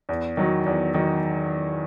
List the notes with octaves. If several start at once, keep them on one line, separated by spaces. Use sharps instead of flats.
E2
D#3 F#3
E2
D#3 F#3